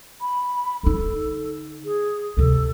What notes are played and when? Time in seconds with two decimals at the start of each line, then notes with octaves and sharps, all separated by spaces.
0.20 B5
0.83 D3 D#4 A4
1.84 G#4
2.37 D2 C3 A4